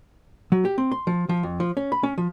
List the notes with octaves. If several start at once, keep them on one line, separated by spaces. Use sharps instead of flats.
F#3
G4
C4
C6
F3
F3
F2
F3
C#4
B5
C#4
F3